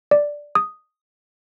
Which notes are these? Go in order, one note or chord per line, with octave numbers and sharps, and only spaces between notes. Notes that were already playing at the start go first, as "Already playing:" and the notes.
D5
D#6